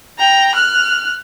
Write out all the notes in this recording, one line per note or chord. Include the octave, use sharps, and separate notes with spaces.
G5 A#5
F6 F#6